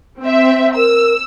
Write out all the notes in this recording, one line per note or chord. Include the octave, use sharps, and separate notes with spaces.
C4 E5
A#4 E6